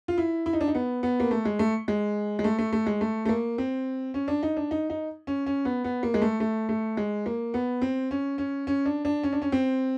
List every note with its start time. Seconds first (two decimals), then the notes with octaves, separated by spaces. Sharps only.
0.08 F4
0.18 E4
0.46 E4
0.53 D#4
0.61 D4
0.68 D#4
0.75 B3
1.03 B3
1.20 A#3
1.31 A3
1.45 G#3
1.59 A3
1.88 G#3
2.39 G#3
2.44 A3
2.59 A3
2.73 A3
2.86 G#3
3.01 A3
3.25 A3
3.29 A#3
3.58 C4
4.14 C#4
4.28 D4
4.43 D#4
4.57 D4
4.71 D#4
4.90 D#4
5.27 C#4
5.46 C#4
5.65 B3
5.84 B3
6.03 A#3
6.14 G#3
6.22 A3
6.40 A3
6.69 A3
6.97 G#3
7.26 A#3
7.54 B3
7.82 C4
8.11 C#4
8.38 C#4
8.67 C#4
8.86 D4
9.05 D4
9.23 C#4
9.33 D4
9.42 C#4
9.52 C4